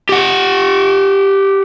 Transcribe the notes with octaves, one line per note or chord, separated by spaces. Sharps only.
G4 F#5